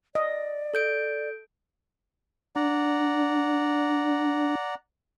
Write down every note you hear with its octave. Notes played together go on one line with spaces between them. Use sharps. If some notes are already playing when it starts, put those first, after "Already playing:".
D5 D#5
A4 G6 D7
D4 D5 F#5 A#5